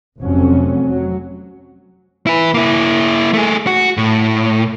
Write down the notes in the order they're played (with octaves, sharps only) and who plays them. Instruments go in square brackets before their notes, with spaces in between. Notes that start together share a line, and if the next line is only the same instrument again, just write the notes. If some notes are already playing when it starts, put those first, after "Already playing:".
[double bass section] F1 F2 F#3 C#4
F#3
[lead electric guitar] E4 B4
A#3 E4
A3 G#4
F#4
A2